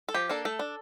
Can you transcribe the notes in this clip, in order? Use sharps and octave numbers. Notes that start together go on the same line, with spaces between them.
A4
F3 G4
A#3 D4 A4
A3 A4
D4